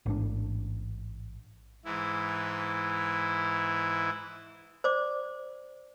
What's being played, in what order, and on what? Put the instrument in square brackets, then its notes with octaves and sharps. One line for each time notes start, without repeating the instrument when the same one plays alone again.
[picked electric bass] A1 G#2 D4
[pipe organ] G#2 E3 E4
[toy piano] C5 D5 D6